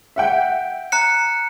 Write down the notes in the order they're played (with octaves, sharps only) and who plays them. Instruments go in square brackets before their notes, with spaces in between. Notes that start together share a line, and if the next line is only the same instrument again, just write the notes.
[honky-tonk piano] E5 F#5 G5
[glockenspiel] A#5 F#6 C#7